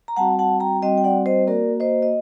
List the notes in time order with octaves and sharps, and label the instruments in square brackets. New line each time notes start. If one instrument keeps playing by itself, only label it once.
[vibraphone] A#5
G3 C4 F#4 F#5 A5
F#5 A5
G5 A#5
G3 C4 F#4 D#5 G5
G5
D5 F#5
C5 D#5
A#3 F#4 A#4 D5
C5 D#5
D#5